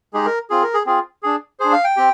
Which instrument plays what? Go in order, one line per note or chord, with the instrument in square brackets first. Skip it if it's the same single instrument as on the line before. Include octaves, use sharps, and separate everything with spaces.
[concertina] G#3 D#4 G4 G#4
A#4
C4 F4 G#4
A#4
G#4
C4 F4 G#4
D4 G#4
D4 G#4 C5
F5
G5
C4 G4